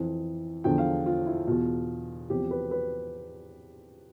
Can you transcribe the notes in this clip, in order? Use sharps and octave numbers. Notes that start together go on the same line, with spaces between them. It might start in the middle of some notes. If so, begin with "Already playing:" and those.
Already playing: F2 E3
E2 D3 F3 G5
F5
F4
E4
E2 B2 F4
E2 C3 F3 G4
B4
B4